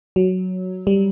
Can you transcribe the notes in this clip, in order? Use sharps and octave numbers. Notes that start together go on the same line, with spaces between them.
F#3
G3